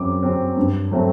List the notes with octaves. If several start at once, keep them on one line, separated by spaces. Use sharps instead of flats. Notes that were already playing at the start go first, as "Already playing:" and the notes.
Already playing: F#2 F#3 C4 D6
F#3 C4
G2
F#3 A3 C4